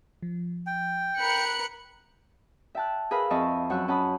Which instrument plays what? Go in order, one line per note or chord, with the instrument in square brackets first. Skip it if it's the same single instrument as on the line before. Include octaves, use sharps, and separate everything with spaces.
[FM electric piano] F3
[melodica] G5
[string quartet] A#4 B5 [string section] F#6 C#7
[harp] E5 G5 A5 F#6
G#4 A#4 B4 F5 B5 E6
F2 D#5 E5 A5 C#6 E6
F#2 F#5 C#6 E6 F#6
C#4 F#5 A5 B5 D#6